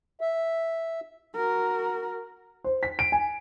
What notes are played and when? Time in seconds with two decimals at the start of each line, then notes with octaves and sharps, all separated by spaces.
0.21 E5
1.35 F#4 A#4
2.64 C5
2.83 B6
2.99 D7
3.12 G#5